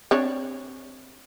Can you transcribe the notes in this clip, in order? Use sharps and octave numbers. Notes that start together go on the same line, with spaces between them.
C4 D4 C#5